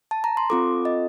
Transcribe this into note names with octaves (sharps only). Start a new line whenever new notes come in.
A5
A#5
C6
C4 F4 A4 D6
D#5